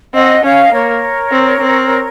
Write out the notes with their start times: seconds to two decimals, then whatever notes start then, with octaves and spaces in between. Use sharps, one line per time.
0.14 C4 D#5 F#5
0.43 C#4 C#5 F5
0.64 D#5
0.72 A#3 A#4 C#5
1.31 C4
1.60 C4